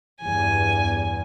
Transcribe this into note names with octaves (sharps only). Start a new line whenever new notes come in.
E2 G2 G#5